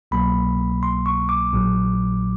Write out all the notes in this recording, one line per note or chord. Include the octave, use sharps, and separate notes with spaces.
C2 B2 F#3 A#3 B5
C6
C#6
D6
A#1 A#2 F#3